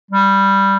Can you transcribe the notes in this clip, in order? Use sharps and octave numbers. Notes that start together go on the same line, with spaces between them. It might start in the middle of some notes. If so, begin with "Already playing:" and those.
G3